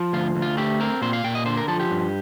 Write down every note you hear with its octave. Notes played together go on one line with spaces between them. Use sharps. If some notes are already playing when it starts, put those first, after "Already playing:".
Already playing: F3
D2 F4
D2
F4
A3 G4
C4 A#4
A#2 C5
F5
A#2 G5
D#5
D3 C5
A#4
F3 A4
G4
G2